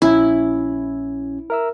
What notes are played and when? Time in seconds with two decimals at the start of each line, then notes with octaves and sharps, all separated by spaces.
0.02 A#1 C#4 E4 G#6
1.50 A#4 E5 E6